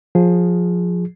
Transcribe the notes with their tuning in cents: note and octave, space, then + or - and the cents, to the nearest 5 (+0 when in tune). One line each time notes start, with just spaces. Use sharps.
F3 +20 G#4 +0